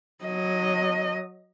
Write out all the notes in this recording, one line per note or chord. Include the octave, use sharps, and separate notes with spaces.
F#3 D#5